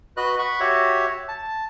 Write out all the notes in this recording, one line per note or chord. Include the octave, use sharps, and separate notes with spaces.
F#4 B4 D#5 F#6
F#5 B5 C#6
F#4 G4 C#5 E5
A5